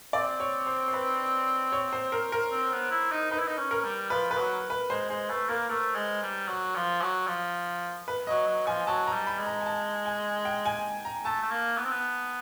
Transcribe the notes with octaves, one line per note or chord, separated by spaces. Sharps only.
C4 D5
C#5
C5
C5
B4
C#5
C5
A#4
A#4
C4
B3
E4
D#4
D#4 B4
E4
D#4
C#4
A#4
G3
F3 B4
B4
F#3
B4
G#3 C5
G#3 C5
A3 B4
A#3 A#4
A3 A#4
G#3
G3
F#3
F3
F#3
F3
B4
F#3 D#5
F#3
F3 G#5
F#3 A5
A#5
G3
B5
G#3
A#5
G#5
A5
G#5
G5
G#5
A#5
A3 A5
A3
A#3
B3
C4
B3